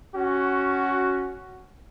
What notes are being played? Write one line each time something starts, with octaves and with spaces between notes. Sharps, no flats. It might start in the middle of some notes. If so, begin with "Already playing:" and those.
C#4 F#4